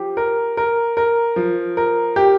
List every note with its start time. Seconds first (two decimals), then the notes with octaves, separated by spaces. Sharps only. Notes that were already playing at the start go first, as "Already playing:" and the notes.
Already playing: F3 G4
0.17 A#4
0.57 A#4
0.97 A#4
1.36 F3
1.77 A#4
2.16 G4